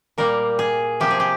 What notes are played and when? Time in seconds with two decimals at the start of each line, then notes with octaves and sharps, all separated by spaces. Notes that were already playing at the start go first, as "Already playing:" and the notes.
0.18 A#2 G3 A#3 A#4
0.59 G#4
1.00 C3 F3 A#3 G4
1.10 G#4
1.20 G4